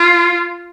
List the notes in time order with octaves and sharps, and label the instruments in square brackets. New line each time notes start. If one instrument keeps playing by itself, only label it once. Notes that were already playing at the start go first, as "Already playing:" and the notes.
Already playing: [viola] F4